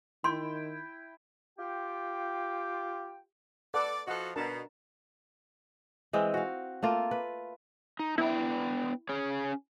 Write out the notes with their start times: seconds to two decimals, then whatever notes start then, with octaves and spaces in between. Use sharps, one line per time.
0.24 D#3 E4 G5 C6
1.58 F4 G4 G5
3.74 A4 B4 D5 F#5
4.07 F3 F#4 A4 D#5 F#5
4.36 B2 D4 A#4 A5
6.13 E3 G#3 C4
6.34 F#4 F5
6.82 A3 A#3 F4
7.11 B4
7.99 D#4
8.18 B3 D4 E4 G5
9.09 C#4 G#4 C#5